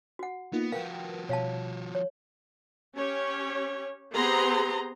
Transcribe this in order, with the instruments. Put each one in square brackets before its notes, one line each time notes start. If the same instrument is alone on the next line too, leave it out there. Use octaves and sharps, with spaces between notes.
[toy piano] F#4 F#5
[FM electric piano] A#3 D#4 F4 [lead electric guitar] B3
[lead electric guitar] F3 F#4 [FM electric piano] A#4 B4 G5 [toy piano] F5
[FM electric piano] B2 [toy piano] C#5 F5 A5
[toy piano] C#5
[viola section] C#4 G4 C#5
B3 C4 G4 G#4 A#5 C6